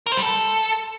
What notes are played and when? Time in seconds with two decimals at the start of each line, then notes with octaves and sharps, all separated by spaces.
0.07 A#4
0.12 C5
0.17 G3
0.22 A4